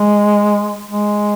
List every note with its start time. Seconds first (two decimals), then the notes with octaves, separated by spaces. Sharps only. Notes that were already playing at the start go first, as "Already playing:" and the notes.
Already playing: G#3
0.91 G#3